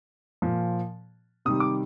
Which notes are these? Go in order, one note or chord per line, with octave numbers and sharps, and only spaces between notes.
A#2 F3
C3 D#3 G3 D#6
D6